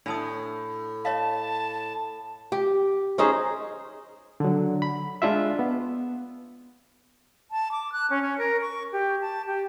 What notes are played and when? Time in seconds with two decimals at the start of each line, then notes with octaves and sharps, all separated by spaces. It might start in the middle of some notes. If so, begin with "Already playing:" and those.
0.06 A2 D4 A5 D#6
1.05 C#5 D#5 F5 A5
2.52 G4
3.18 C#4 D#4 G#4 C5
4.40 D3 F#3
4.82 B5
5.22 G#3 D4 F4 E5
5.59 B3
7.51 A5
7.72 D6
7.92 F#6
8.10 C#4
8.22 C#4
8.38 A#4
8.61 C#6
8.93 G4
9.21 A5
9.47 G4